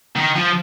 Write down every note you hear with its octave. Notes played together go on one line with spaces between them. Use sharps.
D#3
F3